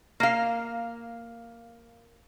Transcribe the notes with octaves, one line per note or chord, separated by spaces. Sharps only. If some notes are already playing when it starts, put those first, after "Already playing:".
A#3 F5